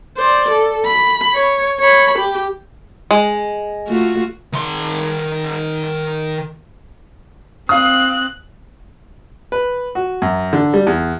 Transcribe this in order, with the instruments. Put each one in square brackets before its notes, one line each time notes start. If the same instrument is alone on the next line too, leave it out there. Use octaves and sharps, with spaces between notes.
[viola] C5 D5
A4
B5
C#5
C#5 B5
G4
[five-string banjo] G#3
[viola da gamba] A3 F4 F#4
[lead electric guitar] D#3 C6
[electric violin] C4 F#6 [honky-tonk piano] F5 D#6
[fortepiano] B4
F#4
F#2
D3
G3
E2